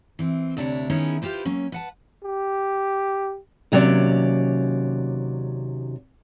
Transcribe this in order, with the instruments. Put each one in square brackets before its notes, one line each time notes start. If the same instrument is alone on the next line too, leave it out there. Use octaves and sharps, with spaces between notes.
[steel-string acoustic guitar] E3 C4
D2 C3 D4 E4 A4 C#5
D#3 B3 C#4 E4 G#4
E4 F4 G4 B4 C5
F#3 A#3 C#4
B4 F#5 A5
[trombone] G4
[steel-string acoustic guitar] D#2 C3 F#3 C#4 D5